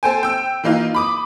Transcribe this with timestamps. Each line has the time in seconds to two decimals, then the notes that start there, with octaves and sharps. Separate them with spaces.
0.03 A4 C5 G5 G#5
0.23 G5 E6
0.64 E3 A#3 D#4 F4
0.95 B5 D6 D#6